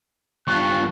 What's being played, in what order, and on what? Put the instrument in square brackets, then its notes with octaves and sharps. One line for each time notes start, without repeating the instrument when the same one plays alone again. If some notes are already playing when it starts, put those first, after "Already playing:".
[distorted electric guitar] G2 F4 [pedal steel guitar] C#6 [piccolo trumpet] F#6